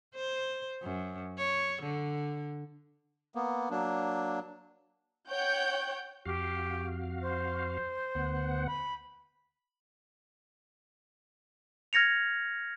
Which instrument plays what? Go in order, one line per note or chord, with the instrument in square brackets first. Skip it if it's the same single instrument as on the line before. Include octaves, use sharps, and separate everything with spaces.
[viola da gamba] C5
F#2
C#5
D3
[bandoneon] A#3 B3
F#3 A#3 D4
[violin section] C#5 F#5 G5 G6
[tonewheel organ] F2 F#4 F5 [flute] G4
[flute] C5
[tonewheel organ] D2 B3 F#5
[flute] B5
[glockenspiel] F6 G#6 A#6 C#7 F7